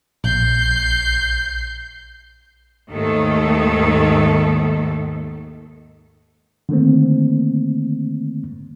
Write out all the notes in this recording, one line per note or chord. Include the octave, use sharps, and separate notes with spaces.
A#1 G6 C7
D#2 G#2 D#3 A3 A4
D3 D#3 A3 A#3 C4